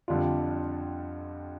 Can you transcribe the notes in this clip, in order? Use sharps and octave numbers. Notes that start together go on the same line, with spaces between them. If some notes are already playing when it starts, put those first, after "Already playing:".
F2 D3 G3 D4 F4